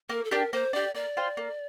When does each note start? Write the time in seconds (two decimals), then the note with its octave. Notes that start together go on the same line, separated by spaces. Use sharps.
0.09 A#3 A#4
0.25 A4
0.31 D4 G4 A#4
0.53 A#3 C5
0.73 D4 G4 D5
0.95 A#3 D5
1.17 F4 C5 G5
1.37 A#3